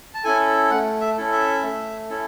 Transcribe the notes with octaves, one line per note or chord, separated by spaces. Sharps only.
A5
C#4 E4 A4 G#5
A3 F#5
E5
C#4 E4 A4
E5
A3
C#4 E4 A4